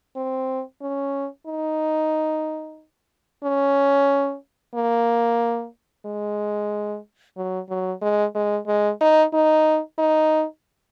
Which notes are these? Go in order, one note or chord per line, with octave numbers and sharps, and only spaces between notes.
C4
C#4
D#4
C#4
A#3
G#3
F#3
F#3
G#3
G#3
G#3
D#4
D#4
D#4